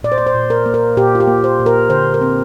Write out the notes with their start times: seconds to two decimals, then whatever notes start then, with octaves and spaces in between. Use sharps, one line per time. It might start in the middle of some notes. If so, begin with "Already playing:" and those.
0.03 A#2 D5
0.12 C5
0.18 D5
0.27 C5
0.35 A#2
0.50 A#4
0.66 A#3
0.74 A#4
0.97 A#2 G4
1.15 F4
1.20 G4
1.27 A#3
1.44 C5
1.60 A#2
1.66 A#4
1.90 D3 C5
2.14 A#4
2.21 C4